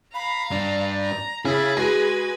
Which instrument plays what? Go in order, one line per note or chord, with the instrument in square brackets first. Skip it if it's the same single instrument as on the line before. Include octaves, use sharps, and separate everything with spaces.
[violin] F5 A#5 [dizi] B5
[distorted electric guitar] G2 D4 [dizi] D5
[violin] A#5
[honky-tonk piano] C#3 [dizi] E4 [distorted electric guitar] G#4 [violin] B5 A6
[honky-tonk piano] G#3 [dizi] F#4 [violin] B4 G#5